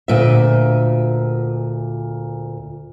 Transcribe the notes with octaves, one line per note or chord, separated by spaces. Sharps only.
D2 A#2 E5